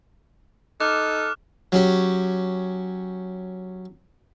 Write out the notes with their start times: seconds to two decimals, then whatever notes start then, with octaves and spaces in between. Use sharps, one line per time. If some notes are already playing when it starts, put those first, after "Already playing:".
0.80 D#4 A4 D6 F6 F#6 E7
1.72 F#3 C#4 G4